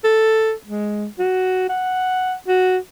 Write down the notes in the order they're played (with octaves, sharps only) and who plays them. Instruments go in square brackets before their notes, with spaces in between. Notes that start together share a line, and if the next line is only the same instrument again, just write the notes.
[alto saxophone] A4
G#3
F#4
F#5
F#4